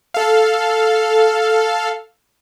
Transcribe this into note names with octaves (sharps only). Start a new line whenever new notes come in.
A4 F5